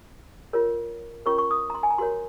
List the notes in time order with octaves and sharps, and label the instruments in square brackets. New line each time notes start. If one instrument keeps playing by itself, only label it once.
[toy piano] F4 A#4 C#5
C#4 F4 A#4 C#5 C#6
C#6
D#6
A#5
C6
G#5
A#5
F#4 A#4 C#5 C6